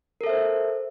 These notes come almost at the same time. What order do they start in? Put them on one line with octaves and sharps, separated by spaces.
A#4 A4 E5 C5